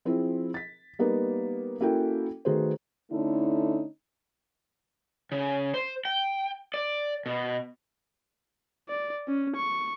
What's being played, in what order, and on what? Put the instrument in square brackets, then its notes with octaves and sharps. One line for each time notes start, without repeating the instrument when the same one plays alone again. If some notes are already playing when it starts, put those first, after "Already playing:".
[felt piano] F3 C4 E4 G#4
A6 B6
G3 A#3 B3 D#4
A#3 C#4 E4 F#4 A4 G5
D#3 A3 F#4 G#4 B4 C5
[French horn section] D3 A3 C#4 D#4 E4
[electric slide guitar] C#3
C5
G5
D5
B2
[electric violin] D5
C#4
C#6